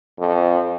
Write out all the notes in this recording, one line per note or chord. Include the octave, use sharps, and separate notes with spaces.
F2